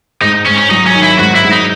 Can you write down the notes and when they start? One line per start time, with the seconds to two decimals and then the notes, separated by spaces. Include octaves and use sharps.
0.21 G#2 D#4
0.46 G#2 C#4
0.58 C#4
0.70 F#3 D#4
0.87 C#4
0.95 D#3
1.03 E4
1.19 G#2 F#4
1.36 E4
1.44 G#2
1.52 D#4